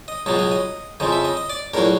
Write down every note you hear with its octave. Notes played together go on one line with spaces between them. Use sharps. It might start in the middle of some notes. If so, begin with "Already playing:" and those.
D#5
C#2 B2 F#3 D#5
D#5
D#5
F2 C#3 F3 D#5
E5
D#5
D#5
D5
A#1 A2 F#3 A#4